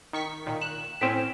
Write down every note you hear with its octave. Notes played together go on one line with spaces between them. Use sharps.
D#3 C#6 B6
A#2 D#3
F#6 E7
A2 C4 C#4 B6 D7 E7